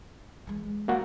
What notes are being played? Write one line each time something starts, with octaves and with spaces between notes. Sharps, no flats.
E3 G#3
A#3 F#4